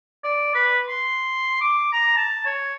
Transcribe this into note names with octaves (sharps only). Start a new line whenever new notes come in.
D5
B4
C6
D6
A#5
A5
C#5